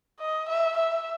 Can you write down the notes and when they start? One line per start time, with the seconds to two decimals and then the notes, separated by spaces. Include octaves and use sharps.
0.20 D#5
0.49 E5
0.78 E5